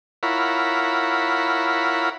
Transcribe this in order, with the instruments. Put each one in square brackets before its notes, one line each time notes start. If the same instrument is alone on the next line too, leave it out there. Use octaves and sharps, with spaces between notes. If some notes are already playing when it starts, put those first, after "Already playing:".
[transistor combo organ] E4 F4 A#4 C#5 F#5 B5